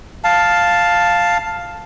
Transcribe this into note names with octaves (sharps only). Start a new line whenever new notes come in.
F5 A5